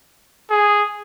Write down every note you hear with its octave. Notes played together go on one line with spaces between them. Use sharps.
G#4